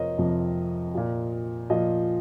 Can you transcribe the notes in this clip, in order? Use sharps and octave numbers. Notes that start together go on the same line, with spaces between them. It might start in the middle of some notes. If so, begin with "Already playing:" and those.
Already playing: F2 C3 F3 A#4 C5 C#5 D#5
F2 C3 F3
A#2 F3
A#2 F3 D#5